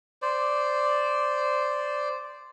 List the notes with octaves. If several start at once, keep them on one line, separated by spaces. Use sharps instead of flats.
C5 D5